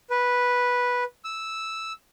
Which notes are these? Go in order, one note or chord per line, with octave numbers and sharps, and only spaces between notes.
B4
E6